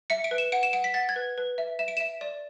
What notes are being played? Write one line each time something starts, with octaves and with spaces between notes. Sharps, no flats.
E5 C#7
D7
B4
E7
F#5 D7
E7
F#5 D7
B6
F#5 A6
G#6
B4
B4
E5
E5 E7
D7
E5 E7
D5